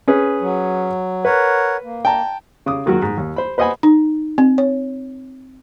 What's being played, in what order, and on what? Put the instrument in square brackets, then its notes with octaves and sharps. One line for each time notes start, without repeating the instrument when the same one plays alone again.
[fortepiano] C#4 G#4 B4
[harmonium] F#3
[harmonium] A#4 C#5 F#5 [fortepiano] B4
[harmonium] A#3
[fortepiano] G5 A5 A#5
C#3 D6 D#6
D#3 F#3 G#3 F#4 A#4
G#2
D#2
C5 B5
B4 C5 D#5 F#5 G#5 B5
[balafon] D#4
C4
C#5